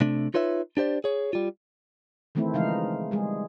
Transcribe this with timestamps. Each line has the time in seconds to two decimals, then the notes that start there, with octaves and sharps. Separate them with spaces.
0.01 C3 A3 D4
0.34 D#4 F4 B4 C#5 E5
0.77 D4 G4 C5 D5
1.04 G#4 C#5
1.33 G3 F4
2.35 D#3 E3 A3 C4 E4
2.54 C#3 E3 F3 G#3 D#4 F5
3.11 G3 G#3 G#4